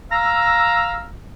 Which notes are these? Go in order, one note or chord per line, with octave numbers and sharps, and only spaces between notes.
F5 A#5 E6